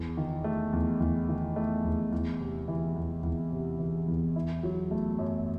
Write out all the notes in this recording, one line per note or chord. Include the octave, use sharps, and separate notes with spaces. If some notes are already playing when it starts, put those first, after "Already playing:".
Already playing: E2
D#3
A3
E2
E2
D#3
A3
E2
E2
C3
E3
E2
E2
C3
E3
E2
E4
F#3
A3
F#2